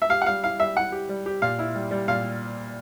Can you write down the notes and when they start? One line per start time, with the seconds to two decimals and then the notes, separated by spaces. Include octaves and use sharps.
0.02 E5
0.10 G4 F5
0.22 F#5
0.26 G3 F5
0.43 E4 F5
0.59 G3 E5
0.76 E4 F#5
0.92 G4
1.09 G3
1.26 G4
1.42 A#2 F5
1.59 E4
1.75 G3
1.91 G3
2.08 A#2 F5